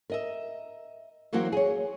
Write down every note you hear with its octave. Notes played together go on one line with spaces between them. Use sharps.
A#4 D#5 E5
E3 F#3 A#3 C4 F#4
G#4 C#5